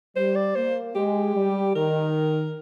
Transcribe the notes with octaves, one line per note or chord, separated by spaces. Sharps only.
G3 C5
D5
A#3 C5
G#3 G4
G3
D#3 A#4